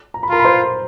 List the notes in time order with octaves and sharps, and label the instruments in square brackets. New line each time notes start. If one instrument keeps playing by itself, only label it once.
[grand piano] A#5
B5
[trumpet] F4 [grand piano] A#4 A#5
[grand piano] B5
C5 C6